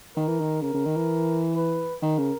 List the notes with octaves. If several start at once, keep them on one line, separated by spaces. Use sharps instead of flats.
D#3 A#4
E3
D#3
C#3 A#4
C#3
D#3
E3
B4
D#3 A#4
C#3